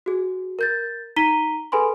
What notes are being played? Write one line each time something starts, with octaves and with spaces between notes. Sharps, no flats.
F#4 G#4
A#4 G6 A6
D#4 A#5 B6 D#7 G7
G#4 A4 B4 G#5 B5 C6